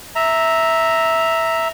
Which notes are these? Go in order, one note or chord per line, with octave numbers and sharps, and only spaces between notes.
E5 A#5